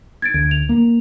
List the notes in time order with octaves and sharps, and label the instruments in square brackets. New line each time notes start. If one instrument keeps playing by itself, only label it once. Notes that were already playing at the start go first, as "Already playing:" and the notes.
[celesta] G#6 A6 D7
[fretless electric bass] D2
[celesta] F7
[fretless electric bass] A#3